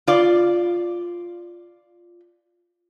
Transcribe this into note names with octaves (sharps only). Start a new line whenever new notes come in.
F4 D5